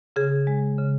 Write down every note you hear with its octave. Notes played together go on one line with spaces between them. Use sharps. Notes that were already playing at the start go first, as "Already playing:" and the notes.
C#3 G#4
G#3
C#3